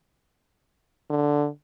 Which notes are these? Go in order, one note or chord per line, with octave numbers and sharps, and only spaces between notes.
D3